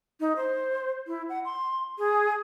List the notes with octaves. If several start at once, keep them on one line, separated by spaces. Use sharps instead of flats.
D#4
C5
E4
F#5
C6
G#4